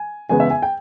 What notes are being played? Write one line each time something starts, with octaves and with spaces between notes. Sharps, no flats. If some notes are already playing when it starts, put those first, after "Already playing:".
Already playing: G#5
E2 C#3 G#3 B3 G#5
E5
G#5
G5